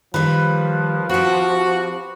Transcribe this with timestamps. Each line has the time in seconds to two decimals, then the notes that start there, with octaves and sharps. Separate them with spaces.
0.14 D#3 F3 G3 B4
1.09 C4 F#4 G4